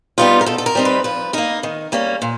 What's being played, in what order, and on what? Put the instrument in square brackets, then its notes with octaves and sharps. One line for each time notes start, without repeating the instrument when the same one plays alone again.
[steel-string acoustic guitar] G3 B3 D#4 F4
A#4
B2 A4
A4
A#4
G3 C4 D#4
B4
F3 B4
A#3 D#4 A#4
D#3
G3 A#3 C#4
A#2